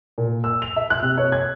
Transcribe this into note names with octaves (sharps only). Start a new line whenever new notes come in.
A#2
E6
F7
E5
F#6
C3
C#5
G#6